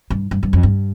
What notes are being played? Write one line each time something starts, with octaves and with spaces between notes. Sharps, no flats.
G2
G2
G2
F2
G2